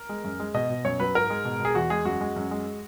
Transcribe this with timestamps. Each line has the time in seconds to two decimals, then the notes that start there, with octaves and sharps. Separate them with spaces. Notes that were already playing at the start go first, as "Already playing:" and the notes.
Already playing: A#4
0.09 G#3
0.24 F#2
0.40 G#3
0.54 B2 D#5
0.70 B2
0.85 F#2 C#5
0.99 F#3 B4
1.15 G#2 A#4
1.30 G#3
1.45 B2
1.60 B2
1.65 G#4
1.75 E2 F#4
1.90 G#3 G#4
2.05 F#2 F#4
2.21 G#3
2.36 F#2
2.51 G#3